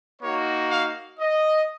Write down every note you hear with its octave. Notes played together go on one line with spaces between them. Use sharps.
A#3 D#4 F#4 C#5
F5
D#5